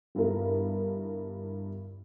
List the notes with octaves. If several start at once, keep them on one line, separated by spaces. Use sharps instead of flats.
G1 G2 B3 E4 A#4